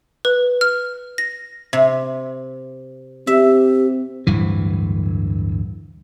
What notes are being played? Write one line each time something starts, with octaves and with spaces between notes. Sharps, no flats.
B4
F6
A#6
C3
C4 G4 E5
D1 G2 E3